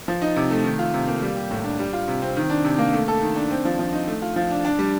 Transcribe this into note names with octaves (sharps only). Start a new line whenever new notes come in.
F3
D#4
C3
A3
D#3
F4
C3
A#3
G3
G4
A2
D4
G3
F4
C3
C4
D#3
D4
C3
A#3
A3
A4
D#3
D4
C4
F3
F3
D#4
A3
F4
F3
D4
D4
G3